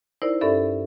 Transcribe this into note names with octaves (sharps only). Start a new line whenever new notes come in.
D#4 E4 A#4 C5 D5
G2 C#4 A4 D5 E5